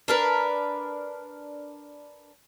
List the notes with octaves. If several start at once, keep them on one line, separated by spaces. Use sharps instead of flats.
D4 A#4 B4